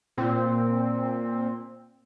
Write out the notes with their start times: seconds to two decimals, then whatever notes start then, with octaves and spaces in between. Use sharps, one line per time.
0.18 A#2 C4